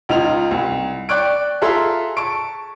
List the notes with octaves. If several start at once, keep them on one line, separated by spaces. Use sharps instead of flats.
C#2 D#4 F4 F7
C2
D5 G5 C#6 F#6 D7
F4 G#4 A4 E5 A#5 C6
A5 C#6 D7